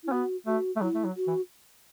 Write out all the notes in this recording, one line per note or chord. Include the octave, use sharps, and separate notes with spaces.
E4
C#4
B3 F#4
A3 F#4
A3
F#3 E4
A3
F#3
F#4
E3